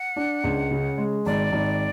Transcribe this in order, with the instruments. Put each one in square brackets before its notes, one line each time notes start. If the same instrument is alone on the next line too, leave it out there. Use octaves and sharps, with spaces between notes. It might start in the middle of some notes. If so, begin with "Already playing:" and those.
Already playing: [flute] F#5
[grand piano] D4
C#2
C#3
G#3
[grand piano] G#1 [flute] D5
[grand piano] G#1